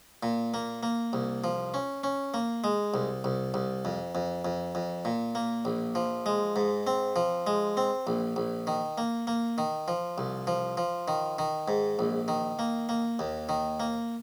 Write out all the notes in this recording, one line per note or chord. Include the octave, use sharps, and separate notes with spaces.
A#2
A#3
A#3
C2
F3
C#4
C#4
A#3
G#3
C2
C2
C2
F2
F2
F2
F2
A#2
A#3
A#1
F3
G#3
G#2
C4
F3
G#3
C4
A#1
A#1
D#3
A#3
A#3
D#3
F3
C2
F3
F3
D#3
D#3
G#2
A#1
D#3
A#3
A#3
D#2
D#3
A#3